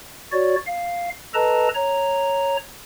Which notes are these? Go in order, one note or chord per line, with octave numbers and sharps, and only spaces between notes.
F#4 C#5 D5
F5
A4 B4 D#5 A5 A#5
C#5 A#5